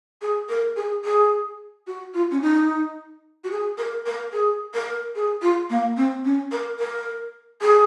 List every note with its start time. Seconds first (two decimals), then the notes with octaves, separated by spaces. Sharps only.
0.22 G#4
0.49 A#4
0.76 G#4
1.05 G#4
1.87 F#4
2.14 F4
2.31 C#4
2.41 D#4
3.44 F#4
3.51 G#4
3.78 A#4
4.06 A#4
4.33 G#4
4.74 A#4
5.16 G#4
5.42 F4
5.70 A#3
5.97 C4
6.25 C#4
6.52 A#4
6.79 A#4
7.62 G#4